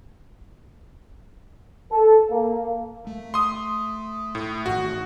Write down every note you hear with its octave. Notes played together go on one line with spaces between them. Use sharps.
A4
A#3
A3
C6 D#6
A2
A1 A2 D#3 F#4